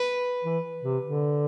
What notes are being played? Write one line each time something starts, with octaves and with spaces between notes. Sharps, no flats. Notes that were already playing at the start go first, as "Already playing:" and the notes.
Already playing: B4
E3
C3
D3